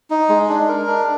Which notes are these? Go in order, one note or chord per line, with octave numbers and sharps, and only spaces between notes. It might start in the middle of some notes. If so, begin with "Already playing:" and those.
D#4
G#3
D4
A#4
D4